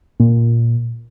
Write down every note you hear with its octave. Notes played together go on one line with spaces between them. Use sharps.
A#2